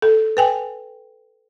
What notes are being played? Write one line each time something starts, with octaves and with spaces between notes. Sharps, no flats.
A4
B4 G5 G#5